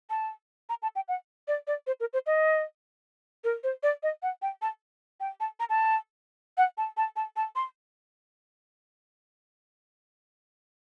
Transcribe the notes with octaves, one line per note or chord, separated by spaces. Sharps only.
A5
A#5
A5
G5
F#5
D5
D5
C5
A#4
C5
D#5
A#4
C5
D5
D#5
F#5
G5
A5
G5
A5
A#5
A5
F#5
A5
A5
A5
A5
C6